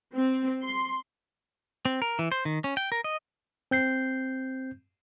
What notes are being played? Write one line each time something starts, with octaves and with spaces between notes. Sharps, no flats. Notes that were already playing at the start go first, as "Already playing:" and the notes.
C4
C6
C4
A#4
E3
C5
D#3
C#4
G5
A#4
D#5
C4 G6 C7